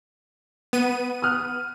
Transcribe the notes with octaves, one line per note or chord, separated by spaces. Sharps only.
B3 D#7
D#6 F6 F#6